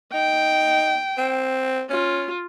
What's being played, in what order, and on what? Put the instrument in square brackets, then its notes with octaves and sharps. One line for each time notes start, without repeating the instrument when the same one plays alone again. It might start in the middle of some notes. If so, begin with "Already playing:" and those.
[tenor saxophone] D#4 [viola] G5
[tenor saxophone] C4
[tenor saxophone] C#4 [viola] F4